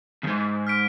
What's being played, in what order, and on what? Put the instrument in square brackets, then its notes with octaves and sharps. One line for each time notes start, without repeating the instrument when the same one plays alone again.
[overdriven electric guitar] E2 G#2
[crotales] F6 B6 D7